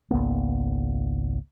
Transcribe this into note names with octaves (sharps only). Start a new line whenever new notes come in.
G#1 C#2 A#3 B3